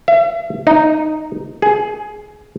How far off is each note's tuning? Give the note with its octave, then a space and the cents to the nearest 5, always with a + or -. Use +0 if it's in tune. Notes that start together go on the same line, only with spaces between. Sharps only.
E5 +40
D#4 -5
G#4 +15